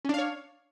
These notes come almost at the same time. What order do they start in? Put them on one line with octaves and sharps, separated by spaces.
C#4 D4 F5 C#5